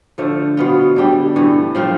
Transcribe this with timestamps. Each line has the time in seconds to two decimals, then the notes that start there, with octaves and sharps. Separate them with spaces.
0.18 D3 F3 A3
0.57 B2 B3 F4
0.96 D3 G3 D4 G4
1.36 G2 E3 A3
1.75 F3 A3 C4 F4